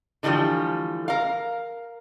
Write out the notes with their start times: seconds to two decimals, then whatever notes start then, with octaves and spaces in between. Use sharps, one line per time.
0.23 D3 E3 F3 G3 A3
1.08 A#4 F5